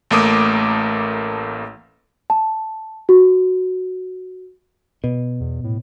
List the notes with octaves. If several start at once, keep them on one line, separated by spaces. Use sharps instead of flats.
A1 A3 A#3 D6 D#6
A5
F#4
B2
E2
A2